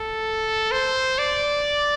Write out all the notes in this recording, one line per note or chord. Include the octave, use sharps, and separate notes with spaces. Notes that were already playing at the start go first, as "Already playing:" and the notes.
Already playing: A4
C5
D5